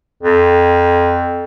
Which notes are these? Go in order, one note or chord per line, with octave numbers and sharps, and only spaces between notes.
F2